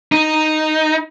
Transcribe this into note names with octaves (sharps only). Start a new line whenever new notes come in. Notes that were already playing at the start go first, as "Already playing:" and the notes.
D#4